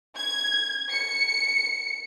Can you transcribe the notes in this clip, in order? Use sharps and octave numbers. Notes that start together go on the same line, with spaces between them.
G#6
C#7